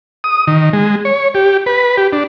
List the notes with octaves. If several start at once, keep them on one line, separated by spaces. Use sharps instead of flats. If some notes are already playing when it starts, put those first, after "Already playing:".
D#6
D#3
G#3
C#5
G4
B4
G4
D4